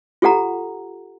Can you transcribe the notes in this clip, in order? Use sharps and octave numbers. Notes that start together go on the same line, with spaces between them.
F4 G4 A4 F#5 A#5